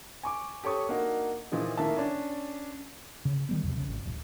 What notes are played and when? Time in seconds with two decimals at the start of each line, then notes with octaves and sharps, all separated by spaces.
0.23 G#5 C#6 D6
0.64 G4 A4 C#5 C#6 D#6
0.89 A#3 D4 D#4 F#4
1.52 A#2 E3 F3 D#4
1.77 A2 D#3 A#3 E5 A5
1.97 C#4 D4
3.25 C#3
3.49 D#3 G3 B3
3.63 B1 E2 C3 F#3
3.77 C#3
3.88 G#1
4.06 D1